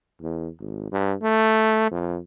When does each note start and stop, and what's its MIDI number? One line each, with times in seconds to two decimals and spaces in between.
0.22 0.48 40
0.60 0.90 32
0.92 1.14 43
1.22 1.86 57
1.91 2.19 41